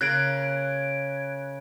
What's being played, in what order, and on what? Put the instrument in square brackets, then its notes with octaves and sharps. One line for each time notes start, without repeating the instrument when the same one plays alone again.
[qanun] C#3 A#3 [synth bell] F#6 G#6 D7